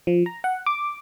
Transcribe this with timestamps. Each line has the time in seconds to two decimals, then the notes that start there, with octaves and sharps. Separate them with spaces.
0.07 F3
0.26 A#5
0.44 F#5
0.66 D6